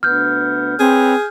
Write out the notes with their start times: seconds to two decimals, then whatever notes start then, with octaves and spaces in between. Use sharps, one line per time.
0.03 D2 B3 F6 G6
0.79 C4 G#4 B4 C#5